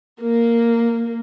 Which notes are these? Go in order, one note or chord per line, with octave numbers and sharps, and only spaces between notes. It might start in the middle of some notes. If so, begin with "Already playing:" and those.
A#3